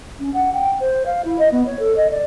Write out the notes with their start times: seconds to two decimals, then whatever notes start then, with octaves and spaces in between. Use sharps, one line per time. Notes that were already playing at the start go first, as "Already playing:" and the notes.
0.20 C#4
0.34 F#5
0.53 G5
0.80 C5
1.06 F5
1.25 E4
1.39 D#5
1.52 B3
1.66 C#5
1.79 A4
1.97 D#5
2.11 D5